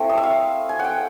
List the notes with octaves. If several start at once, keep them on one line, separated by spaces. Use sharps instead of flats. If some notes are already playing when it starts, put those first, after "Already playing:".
Already playing: A3 C4 E4
D#5
E5
F5
G#5
F#5 G5